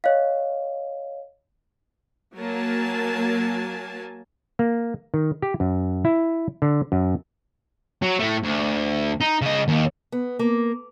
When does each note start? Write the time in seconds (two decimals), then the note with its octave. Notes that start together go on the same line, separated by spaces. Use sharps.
0.04 C#5 D#5 F5
2.36 F#3 A#3 A#4 G#5 A5
4.59 A#3
5.14 D#3
5.42 G4
5.60 F#2
6.05 E4
6.62 D3
6.92 F#2
8.02 F#3
8.20 A2 A3
8.43 D2
9.21 D#4
9.42 C#3 D#5
9.68 D#2
10.12 B3
10.39 A#3